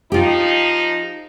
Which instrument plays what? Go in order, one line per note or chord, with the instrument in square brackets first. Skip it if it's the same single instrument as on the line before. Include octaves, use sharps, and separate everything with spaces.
[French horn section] F3 D#4 [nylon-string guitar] F4 G4